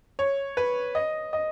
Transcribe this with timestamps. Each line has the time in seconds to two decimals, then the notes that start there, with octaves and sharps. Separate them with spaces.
0.19 C#5
0.57 B4
0.95 D#5
1.33 D#5